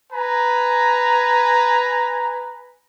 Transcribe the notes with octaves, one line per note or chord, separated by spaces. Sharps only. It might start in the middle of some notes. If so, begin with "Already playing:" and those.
B4 G#5 A#5